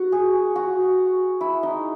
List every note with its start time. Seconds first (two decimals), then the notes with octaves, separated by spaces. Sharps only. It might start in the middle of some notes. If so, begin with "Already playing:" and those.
Already playing: F#4
0.12 G#4
0.56 F#4
1.41 E4
1.63 D#4